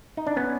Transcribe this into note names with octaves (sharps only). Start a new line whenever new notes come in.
D#4
D4
B3 C#4